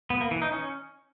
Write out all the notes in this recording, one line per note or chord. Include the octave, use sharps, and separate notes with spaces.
B3
A#3
E3
D#4
C#4